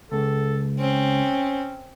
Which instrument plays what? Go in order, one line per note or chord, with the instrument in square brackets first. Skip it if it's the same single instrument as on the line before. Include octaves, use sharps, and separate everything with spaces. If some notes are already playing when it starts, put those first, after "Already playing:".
[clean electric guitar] C#2 [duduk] A4
[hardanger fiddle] C4 [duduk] C#4